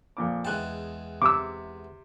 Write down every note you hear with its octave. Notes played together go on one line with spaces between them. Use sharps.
F2 A#2 D6
E2 G#3 G5 A5 F#6
C3 D6 E6